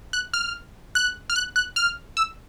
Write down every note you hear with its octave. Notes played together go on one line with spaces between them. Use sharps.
F#6
F6
F#6
F6
F#6
F#6
F6
E6